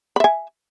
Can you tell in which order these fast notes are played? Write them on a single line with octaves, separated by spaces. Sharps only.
B5 E5 G#5